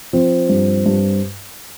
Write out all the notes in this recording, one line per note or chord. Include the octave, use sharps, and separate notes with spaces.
F3 C4
G2
G2